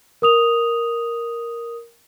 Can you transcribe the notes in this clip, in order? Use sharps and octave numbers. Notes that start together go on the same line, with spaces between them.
A#4 D#6 F7